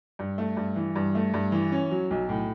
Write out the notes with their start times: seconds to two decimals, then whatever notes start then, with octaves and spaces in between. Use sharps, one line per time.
0.19 G2
0.38 A3
0.57 G2
0.76 E3
0.96 G2
1.15 A3
1.34 G2
1.52 E3
1.72 C#4
1.91 F#3
2.11 B1
2.29 A2